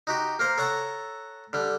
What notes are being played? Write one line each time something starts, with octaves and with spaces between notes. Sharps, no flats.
D#4 F#4 G4
A#3 A#4 C5
A4 C#5 F#5 A5 A#5
D3 G3